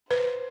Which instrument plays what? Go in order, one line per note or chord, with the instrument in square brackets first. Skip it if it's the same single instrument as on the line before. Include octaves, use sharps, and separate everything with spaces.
[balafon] B4 [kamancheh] C5